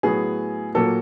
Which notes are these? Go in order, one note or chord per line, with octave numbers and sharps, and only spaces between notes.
A2 F#3 B3 G#4
A#2 F#3 A#3 A4